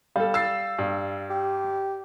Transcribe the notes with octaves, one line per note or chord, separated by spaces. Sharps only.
G3 A4 F5
E6 A6 C7
G2
G4